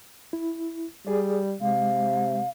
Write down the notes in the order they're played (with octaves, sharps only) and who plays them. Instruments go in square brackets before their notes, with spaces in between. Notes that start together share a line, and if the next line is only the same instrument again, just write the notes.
[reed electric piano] E4
[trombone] G3 [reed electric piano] G#4 D5
[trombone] C3 [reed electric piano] G#3 [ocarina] F5